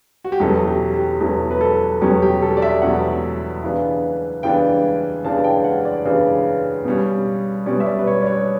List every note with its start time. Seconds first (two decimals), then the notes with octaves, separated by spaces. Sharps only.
0.24 F#4
0.32 G4
0.40 E2 B2 F#3 C#4 A4
0.67 G4
0.94 G4
1.20 E2 B2 F#3 C#4 A4
1.51 B4
1.61 A4
2.01 E2 B2 F#3 C#4 G4
2.22 G4
2.42 A4
2.57 D5
2.62 E5
2.82 E2 B2 F#3 C#4 F#5
3.64 C#3 E3 B3 D4
4.43 C#3 E3 B3 D4 G5
5.24 C#3 E3 B3 D4 A5
5.39 A5
5.44 G5
5.64 F#5
5.85 D5
6.05 C#3 E3 B3 D4
6.85 B2 G3 C#4
7.66 B2 G3 C#4 D5
7.80 E5
7.86 D5
7.99 B4
8.07 C#5
8.22 D5
8.26 C#5